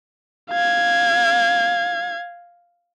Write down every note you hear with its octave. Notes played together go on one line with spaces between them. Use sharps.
F5 G#6